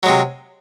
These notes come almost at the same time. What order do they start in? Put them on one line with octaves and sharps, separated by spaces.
F#3 G#3 C3